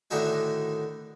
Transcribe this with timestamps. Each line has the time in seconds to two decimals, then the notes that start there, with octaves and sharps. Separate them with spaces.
0.11 A2 D3 D#3 D#4 F#4 E5